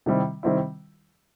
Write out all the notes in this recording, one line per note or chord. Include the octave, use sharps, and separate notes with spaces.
C3 D#3 G3 C4 E4
C3 D#3 G3 C4 E4